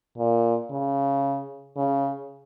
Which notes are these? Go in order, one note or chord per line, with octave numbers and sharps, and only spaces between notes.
A#2
C#3
C#3